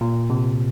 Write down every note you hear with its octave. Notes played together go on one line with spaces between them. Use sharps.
A#2
C3